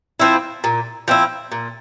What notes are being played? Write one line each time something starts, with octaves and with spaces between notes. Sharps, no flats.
F3 C4 E4
A#2
F3 C4 E4
A#2